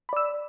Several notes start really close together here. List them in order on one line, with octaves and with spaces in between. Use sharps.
B5 D5 E6